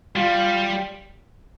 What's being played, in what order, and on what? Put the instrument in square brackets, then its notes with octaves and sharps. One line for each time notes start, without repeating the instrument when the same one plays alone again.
[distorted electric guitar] G3 [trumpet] F4